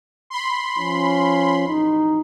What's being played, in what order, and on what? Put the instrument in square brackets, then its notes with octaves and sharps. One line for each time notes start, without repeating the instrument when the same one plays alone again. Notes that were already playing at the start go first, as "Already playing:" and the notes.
[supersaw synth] B5 C6
[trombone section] F3 C#4
A1 F2 D#4